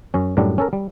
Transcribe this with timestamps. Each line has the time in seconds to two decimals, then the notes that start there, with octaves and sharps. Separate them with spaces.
0.14 F#2 C#4
0.37 F#2 A2 F#3 G3 D4
0.58 C#4 A4 A#4
0.73 G3